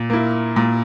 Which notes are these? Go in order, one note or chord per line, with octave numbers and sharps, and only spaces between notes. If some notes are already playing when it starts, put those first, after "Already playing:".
Already playing: A#2
A#3 E4
A#2